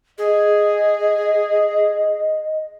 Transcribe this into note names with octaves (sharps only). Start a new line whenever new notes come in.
G#4 D#5